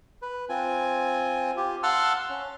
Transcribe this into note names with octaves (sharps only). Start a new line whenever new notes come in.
B4
C4 F4 G#5
F4 G4
F5 F#5 A5 C6 E6 F6
C#4